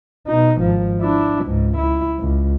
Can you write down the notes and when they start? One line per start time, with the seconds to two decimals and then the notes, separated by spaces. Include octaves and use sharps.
0.27 B2 D#4
0.61 G#1 F3
1.01 D4 E4
1.46 C#2 G#2
1.78 E4
2.19 C#2